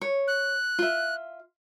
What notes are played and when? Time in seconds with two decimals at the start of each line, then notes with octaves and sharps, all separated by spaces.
0.01 C#5
0.28 F#6
0.79 F4 E5